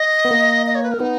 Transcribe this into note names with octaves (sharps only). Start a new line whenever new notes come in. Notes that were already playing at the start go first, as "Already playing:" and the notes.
Already playing: D#5
B3
A#3
D#5
C#5
B4
A#4
B3 D#4